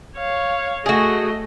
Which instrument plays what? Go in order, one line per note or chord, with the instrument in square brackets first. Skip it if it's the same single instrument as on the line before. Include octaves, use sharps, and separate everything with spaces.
[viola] C#5 F5
[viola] A3 D#5 [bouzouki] F#4 G#4